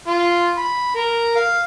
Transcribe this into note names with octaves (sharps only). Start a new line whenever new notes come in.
F4
B5
A#4
F5